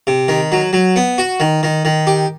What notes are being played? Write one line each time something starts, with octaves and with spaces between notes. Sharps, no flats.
C3
D#3
F#3
F#3
B3
F#4
D#3
D#3
D#3
G4